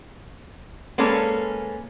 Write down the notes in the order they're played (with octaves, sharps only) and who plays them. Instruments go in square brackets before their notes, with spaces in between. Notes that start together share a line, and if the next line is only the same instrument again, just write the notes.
[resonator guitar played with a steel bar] G#3 A#3 C#4 A4 B4